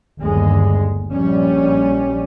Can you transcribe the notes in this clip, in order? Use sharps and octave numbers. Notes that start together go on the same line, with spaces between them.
G1 D#2 G#3
A#1 G3 C#4